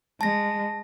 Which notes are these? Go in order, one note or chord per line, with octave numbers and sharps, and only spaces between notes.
G#3 A5 A#6